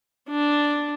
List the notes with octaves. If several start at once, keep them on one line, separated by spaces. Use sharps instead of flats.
D4